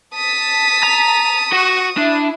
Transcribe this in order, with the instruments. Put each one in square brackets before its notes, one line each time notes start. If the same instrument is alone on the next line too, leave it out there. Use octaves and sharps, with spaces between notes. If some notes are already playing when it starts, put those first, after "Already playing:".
[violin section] A5 B6 [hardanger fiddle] D#6
[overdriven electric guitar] A#5
[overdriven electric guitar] F#4 [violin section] C#6
[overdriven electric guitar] D4 [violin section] E4